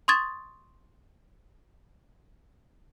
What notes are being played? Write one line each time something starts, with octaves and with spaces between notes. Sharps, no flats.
C6 C#6 D#6 G#6 A6 E7